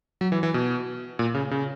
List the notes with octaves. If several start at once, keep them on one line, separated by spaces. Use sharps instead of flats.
F#3
E3
E3
B2
A#2
C#3
C#3